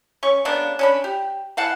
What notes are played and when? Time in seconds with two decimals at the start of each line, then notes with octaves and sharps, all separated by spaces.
0.23 C#4 C#6
0.45 C#3 A#3 B3 D4
0.79 C#4 D4 B5
1.04 G4
1.57 E3 F5 F#5 A5